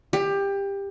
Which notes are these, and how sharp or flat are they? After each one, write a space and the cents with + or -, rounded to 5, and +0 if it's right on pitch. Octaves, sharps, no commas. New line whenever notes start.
G4 +20